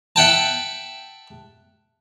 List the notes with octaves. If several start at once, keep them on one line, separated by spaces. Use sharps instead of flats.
E5 F#5 G5 A5